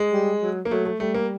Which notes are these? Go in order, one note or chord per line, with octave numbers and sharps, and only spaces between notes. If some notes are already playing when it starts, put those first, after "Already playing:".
Already playing: G#3
G3
F#3
A#3
F#3 A3
A3
G3 A3
A#3